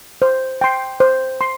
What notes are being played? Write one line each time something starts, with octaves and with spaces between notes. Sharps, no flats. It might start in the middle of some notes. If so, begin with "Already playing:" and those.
C5
G5 C6
C5
C6